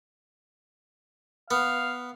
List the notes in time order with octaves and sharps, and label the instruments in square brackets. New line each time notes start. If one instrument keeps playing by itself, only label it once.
[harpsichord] B3 [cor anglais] F5